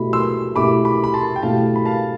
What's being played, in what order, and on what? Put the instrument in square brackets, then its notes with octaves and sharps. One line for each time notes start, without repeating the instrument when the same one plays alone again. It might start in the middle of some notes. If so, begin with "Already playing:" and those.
Already playing: [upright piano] B2 A3 E4 G4 [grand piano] B5
[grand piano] C6 E6
[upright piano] B2 A3 E4 G4 [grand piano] B5 D6
[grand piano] B5 D6
B5
A5 C6
G5
[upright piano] B2 A3 E4 G4 [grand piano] F5 A5
[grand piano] B5
F5 A5